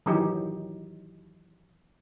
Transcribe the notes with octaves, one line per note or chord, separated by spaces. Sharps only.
D#3 E3 F#3 D#4 G4